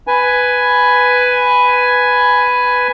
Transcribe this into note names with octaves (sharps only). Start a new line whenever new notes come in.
B4 G#5